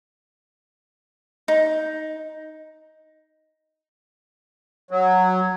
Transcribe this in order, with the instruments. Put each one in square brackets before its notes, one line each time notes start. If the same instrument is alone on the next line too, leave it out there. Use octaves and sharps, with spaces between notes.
[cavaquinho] D#4
[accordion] F#3